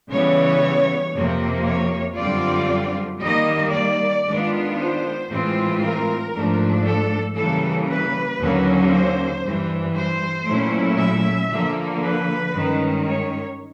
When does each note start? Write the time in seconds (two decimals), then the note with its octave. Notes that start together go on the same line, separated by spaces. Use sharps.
0.11 C#3 E3 G3 B3 C#5
1.15 F2 C3 F3 A#3
1.66 C#5
2.18 F#2 D3 G3 C4 F4 D5
3.22 D#3 G3 A#3 D#5
3.74 D5
4.26 D#3 G#3 B3 D4 F4
4.78 C5
5.30 A2 E3 G#3 C4 F4
5.82 A#4
6.34 G#2 F3 A3 D4
6.85 A4
7.37 C#3 E3 G3 A#3 A4
7.89 B4
8.41 D#2 D3 F#3 A#3 C#4
8.92 C5
9.44 G2 E3 G3
9.97 C5
10.48 A#2 F#3 A3 C#4 E4
11.00 E5
11.52 D3 F3 A#3
12.04 B4
12.56 G2 D#3 G#3 C#4
13.07 C#5